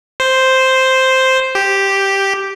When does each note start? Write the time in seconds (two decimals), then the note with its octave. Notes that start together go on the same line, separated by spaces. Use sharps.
0.20 C5
1.55 G4